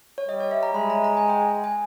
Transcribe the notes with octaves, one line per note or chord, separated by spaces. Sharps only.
C#5
G3 D#5
C#5
E5
A#5
G#3 B5
A#5
A#5
G#5
G5
G#5
G#5